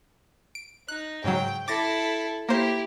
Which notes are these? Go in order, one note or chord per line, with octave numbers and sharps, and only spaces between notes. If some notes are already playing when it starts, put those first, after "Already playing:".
D7
D#4 F#6
G#2 C#3 F#3 G5
E4 A4 D6 A6 A#6
A#3 E4 G4 C5